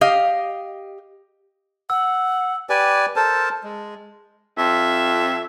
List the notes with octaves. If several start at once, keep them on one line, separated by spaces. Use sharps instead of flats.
G4 D#5 F5
F#5 E6
G4 B4 D5 G#5
A4 A#4 C5 A5
G#3
F2 E5